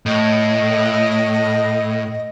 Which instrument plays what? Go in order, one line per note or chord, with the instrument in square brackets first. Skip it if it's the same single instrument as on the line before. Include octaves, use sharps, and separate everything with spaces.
[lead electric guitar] A2 [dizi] D#5